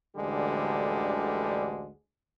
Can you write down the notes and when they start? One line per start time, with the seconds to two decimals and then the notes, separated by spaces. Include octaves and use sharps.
0.16 A1 D2 D3 G3 G#3